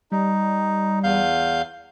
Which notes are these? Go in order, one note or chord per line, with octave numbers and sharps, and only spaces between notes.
G3 D#4
E2 F5 G6